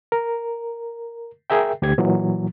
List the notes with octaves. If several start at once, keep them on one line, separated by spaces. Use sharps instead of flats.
A#4
G#4 A#4 E5 G5
D2 G4 G#6
A#2 E3 F#3